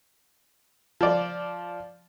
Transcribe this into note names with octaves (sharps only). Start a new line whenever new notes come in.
F3 D5